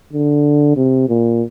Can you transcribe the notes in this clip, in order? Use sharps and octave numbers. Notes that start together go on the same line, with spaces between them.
D3
C3
A#2